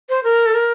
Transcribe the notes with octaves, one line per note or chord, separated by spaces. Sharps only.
C5
A#4
A4
A#4